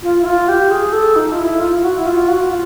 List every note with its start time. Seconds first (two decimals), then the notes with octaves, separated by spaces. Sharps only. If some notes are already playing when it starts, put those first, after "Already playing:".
0.03 F4
0.22 E4
0.26 F4
0.48 G4
0.70 G#4
0.93 A4
1.16 D#4
1.32 F4
1.39 E4
1.60 F4
1.82 F#4
1.98 E4
2.06 F4
2.28 F#4
2.50 F4